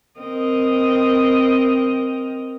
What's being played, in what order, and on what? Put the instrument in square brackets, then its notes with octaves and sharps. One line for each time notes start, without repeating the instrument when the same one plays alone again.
[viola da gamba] C4 A#4 D#5